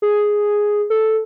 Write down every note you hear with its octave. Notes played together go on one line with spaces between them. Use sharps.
G#4
A4